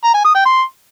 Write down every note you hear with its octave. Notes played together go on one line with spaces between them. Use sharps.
A#5
G#5
D#6
G5
C6